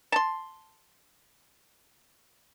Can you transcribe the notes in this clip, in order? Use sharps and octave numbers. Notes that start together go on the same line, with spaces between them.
A5 C6